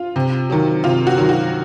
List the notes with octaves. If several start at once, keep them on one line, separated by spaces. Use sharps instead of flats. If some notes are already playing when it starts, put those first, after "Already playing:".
Already playing: F4
C3
D#3 F#3
C3 F4
F#4
D#3 F#3
F#4